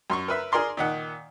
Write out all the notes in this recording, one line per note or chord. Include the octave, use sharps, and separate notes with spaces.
F#2 C6 C#6
A#4 B4 E5
G#4 A#4 D5 A#5 C6 D6
A#2 D#3 F#5